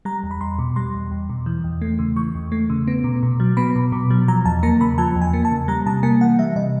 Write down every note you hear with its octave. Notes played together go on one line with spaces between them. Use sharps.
G3 A#5
E2
B5
E2 C6
B2
G3 C6
E2
E2
B2
E3
E2
A3
C#3
E3 C#6
E2
A3
C#3
B3
B2
B2
F#3
B3 B5
B2
B2
F#3
F3 A#5
E2 A5
A#3 A#5
C#3 B5
F3 A5
E2
G#5
A#3
A5
C#3
G3 A#5
C3 A5
A#3 G#5
E3 F#5
G3 E5
C3 D#5